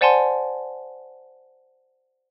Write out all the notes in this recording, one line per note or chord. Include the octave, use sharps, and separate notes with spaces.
C5 D5 F#5 G#5 A5 C6